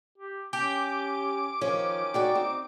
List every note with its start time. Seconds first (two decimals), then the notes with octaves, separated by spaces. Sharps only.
0.18 G4
0.53 C#4 G4 D6
1.61 D#3 F3 C#4
2.14 D#4 F#4 D5 G5
2.35 C4